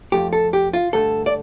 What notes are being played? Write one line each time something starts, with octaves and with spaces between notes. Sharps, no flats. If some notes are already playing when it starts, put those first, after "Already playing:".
F2 F3 A3 G4
A4
G4
F4
G2 D3 A3 A4
D5